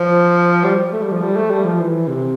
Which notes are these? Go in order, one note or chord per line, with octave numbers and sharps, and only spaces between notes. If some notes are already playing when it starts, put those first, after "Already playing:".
Already playing: F3
G3
A3
G3
F3
G3
A3
G3
F3
E3
C3